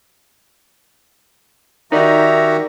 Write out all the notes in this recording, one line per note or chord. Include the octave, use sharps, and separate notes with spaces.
D#3 D#4 F#4 G4 A#4 D5 E5 A#5